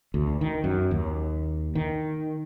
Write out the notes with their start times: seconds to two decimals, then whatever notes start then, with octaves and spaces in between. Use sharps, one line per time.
0.14 D2
0.41 D#3
0.64 F#2
0.91 D#2
1.75 D#3